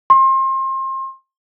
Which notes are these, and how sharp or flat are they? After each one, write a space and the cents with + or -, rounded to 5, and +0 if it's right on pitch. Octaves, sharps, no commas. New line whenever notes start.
C6 +30